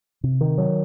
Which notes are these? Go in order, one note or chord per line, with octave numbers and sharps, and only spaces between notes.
C3
D#3
F#3